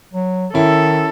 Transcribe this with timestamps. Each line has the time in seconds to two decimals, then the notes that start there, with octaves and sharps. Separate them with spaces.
0.13 F#3
0.54 D#3 C#4 E4 A4